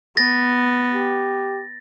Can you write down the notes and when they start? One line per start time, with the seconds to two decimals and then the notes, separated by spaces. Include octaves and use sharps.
0.17 B3 A6 A#6
0.93 G4